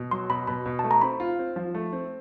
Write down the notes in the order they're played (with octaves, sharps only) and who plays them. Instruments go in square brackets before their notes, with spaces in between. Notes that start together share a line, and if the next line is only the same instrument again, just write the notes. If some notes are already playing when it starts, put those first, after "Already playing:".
Already playing: [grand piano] B2
[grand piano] F#3 [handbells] C6
[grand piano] B2 [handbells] B5
[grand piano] B2 [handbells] B5
[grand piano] B2
[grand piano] A3 [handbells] A5
[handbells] A#5
[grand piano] C4 [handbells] B5
[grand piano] F4
C4
F3
A3
C4